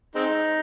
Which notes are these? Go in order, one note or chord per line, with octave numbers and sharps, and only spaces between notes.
G#3 C4 D#4